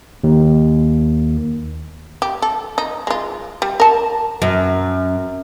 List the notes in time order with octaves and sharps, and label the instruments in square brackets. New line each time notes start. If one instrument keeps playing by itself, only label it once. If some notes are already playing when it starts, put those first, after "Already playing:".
[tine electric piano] D#2
[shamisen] G4
A4
D#4
G#3 F4
G3
A#4 A5
[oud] F#2